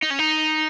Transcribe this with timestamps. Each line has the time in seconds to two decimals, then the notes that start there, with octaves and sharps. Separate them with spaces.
0.03 D#4
0.10 C#4
0.19 D#4